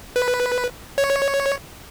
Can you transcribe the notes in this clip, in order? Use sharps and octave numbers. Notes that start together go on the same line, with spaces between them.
B4
C#5